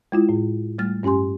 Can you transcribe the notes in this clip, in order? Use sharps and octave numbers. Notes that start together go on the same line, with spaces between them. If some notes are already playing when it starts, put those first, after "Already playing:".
G#3 E4 F4
A2
G3 A3 F6 A6
G2 C#4 G4 G#5 C6